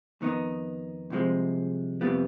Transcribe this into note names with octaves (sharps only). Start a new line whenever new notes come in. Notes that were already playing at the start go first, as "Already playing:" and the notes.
F2 D#3 B3 D#4
C2 C3 F3 G#3
F2 C3 G3 B3 F4